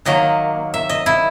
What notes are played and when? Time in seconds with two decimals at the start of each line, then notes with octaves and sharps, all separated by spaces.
0.05 D#3 F#3 A#3 D#5
0.74 E5
0.89 D#5
1.06 E4